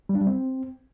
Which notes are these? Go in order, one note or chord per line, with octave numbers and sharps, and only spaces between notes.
G3
D4
G3
C4